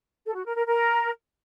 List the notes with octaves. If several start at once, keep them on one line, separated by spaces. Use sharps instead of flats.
A4
F#4
A#4
A#4
A#4